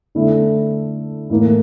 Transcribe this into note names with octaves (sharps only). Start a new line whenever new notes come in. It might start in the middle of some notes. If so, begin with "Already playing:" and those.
D3 A3 E4
A2 E3 A#3